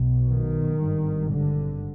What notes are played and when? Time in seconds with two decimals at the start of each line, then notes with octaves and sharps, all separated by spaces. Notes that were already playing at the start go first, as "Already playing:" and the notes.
Already playing: B1 B2
0.29 D#3
0.79 G#1 G2
1.31 D3